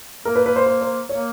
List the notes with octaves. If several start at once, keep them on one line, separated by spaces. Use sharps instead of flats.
A#3 A#4
B4
B4
C5
C5
C5
A#3 C#5